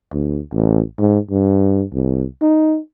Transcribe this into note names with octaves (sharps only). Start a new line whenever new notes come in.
D2
A1
G#2
G2
C2
D#4